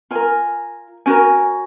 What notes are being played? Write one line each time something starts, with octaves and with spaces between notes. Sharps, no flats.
F4 A#4 G#5
C#4 F#4 A#4 G#5